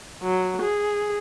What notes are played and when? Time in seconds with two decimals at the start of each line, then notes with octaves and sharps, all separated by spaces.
0.23 F#3
0.62 G#4